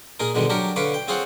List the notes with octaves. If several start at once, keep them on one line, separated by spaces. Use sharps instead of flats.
A#2 D#4 G#4 A#4
G#2 B2 D3 D#3 G3 G#3
F#3 D4 G4 A#4 C#5
D3 B4 C#5 F5 D6
G5
C4 F4 G#4 C5 C#5 F#5